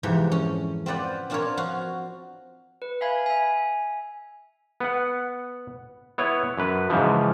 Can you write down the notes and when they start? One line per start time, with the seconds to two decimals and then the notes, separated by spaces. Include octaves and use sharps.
0.03 F2 G#2 C3 E3
0.32 C#4
0.86 C4 F4 B4 D5 F#5 G5
1.30 C4 D4 F4 A#4 B4 C#5
1.57 F3 F#4 F5
2.82 B4
3.01 E5 F5 G#5 B5 G#6
3.26 E5 G#5
4.80 B3 F#5
6.18 B3 E4 C#5
6.58 F#2 B4
6.90 G#2 C#3 E3 F3